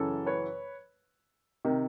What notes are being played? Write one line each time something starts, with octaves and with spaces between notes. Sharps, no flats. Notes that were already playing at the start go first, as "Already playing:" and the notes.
Already playing: F#2 C#3 E3 A4
B4 C#5
C3 D#3